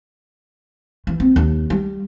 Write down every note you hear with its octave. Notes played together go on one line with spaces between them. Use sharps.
E3
C4
D#2
G3